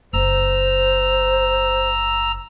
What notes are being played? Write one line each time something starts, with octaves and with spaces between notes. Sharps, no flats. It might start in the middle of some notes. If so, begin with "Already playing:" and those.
F#1 C5 A#5 E6